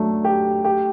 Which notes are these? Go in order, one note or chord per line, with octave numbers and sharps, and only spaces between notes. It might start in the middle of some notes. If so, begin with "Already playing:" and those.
Already playing: F#3 A3 D4
G4
G4